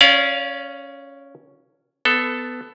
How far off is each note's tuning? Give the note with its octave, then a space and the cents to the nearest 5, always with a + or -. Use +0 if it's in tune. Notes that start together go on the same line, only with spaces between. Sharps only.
C#4 +0 D5 -35 F5 +0
B3 +15 A4 +0